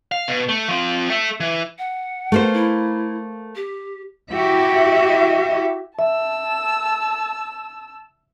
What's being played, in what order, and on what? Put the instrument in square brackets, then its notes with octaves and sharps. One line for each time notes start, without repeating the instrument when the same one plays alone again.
[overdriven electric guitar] F5
B2
A3
F3 C4
A4 E5
E3
[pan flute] F#5
[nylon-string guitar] A3 A#3 C5
[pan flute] E4
G4
[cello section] E4 F#4 G4 E5
[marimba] E5 [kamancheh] A5 E6